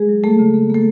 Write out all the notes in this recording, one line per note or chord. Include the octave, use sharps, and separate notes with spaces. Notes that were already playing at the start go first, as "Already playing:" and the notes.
Already playing: G#3 G#4
F#3
A3 A#3 A4
C#3
A#3
A3 A#3 A4